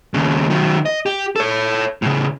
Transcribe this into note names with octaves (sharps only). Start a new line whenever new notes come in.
D#2 C#3
D#3 F#3
D#5
G4
A4 C#5
A2 C#3